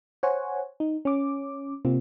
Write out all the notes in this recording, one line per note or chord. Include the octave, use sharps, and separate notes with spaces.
C5 C#5 F#5 G#5
D#4
C#4 D6
C3 A#3 C4 F4